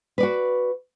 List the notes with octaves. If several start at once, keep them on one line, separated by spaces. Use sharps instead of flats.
F#4 B4 D5